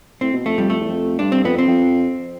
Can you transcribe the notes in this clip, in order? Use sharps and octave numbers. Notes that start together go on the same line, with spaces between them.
A2 C4
B2
F2 A3
F2 G3
F2 A3
E2
F2
G2 D4
C4
F2 B3
C4
F2